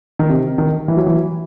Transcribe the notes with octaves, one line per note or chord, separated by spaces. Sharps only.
D#3
C3
D#3
E3
F#3
E3